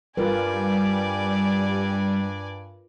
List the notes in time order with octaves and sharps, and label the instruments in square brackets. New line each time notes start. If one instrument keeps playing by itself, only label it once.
[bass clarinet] G2 [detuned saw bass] G3 [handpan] F4 A#4 B4 [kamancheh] D5 G#5